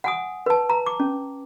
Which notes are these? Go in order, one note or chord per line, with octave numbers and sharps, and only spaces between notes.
F#5 G#5 D#6
B4 A5
A#5
D6
C#4